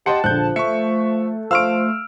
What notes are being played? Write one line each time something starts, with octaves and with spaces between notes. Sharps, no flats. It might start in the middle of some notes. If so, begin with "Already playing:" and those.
G4 D#5 F#5 G5 A5 C6 C#7
A#1 D3 F3 F#6 G6
A3 E5 C#6 C#7
F3 F5 C6 C#6 E6 F6 D7